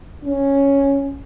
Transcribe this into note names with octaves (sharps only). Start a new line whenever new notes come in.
C#4